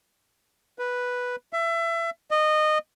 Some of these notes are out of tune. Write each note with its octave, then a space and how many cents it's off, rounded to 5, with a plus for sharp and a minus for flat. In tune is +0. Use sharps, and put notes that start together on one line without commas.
B4 -5
E5 +25
D#5 -20